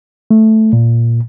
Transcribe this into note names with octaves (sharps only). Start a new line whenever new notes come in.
A3
A#2